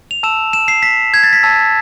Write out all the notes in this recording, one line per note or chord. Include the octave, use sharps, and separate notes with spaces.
F7
A5 E6 E7
E7
C7
B6
G#6
A6
B6
A5 E6